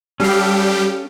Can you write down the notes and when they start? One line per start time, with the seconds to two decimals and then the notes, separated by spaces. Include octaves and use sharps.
0.20 G3 C#4 G4 A4 F5